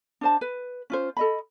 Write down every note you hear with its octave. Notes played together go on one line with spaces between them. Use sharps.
D4 C5 A5
B4
C#4 F4 C5
A4 D#5 B5